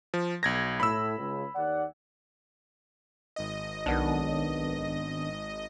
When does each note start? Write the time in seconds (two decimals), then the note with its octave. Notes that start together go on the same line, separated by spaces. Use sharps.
0.14 F3
0.43 B1 G#6 A#6
0.80 A2 B5 E6
1.18 C#2
1.55 D#2 D5 F#5
3.36 G#1 D#5
3.86 B1 D#3 B3 D4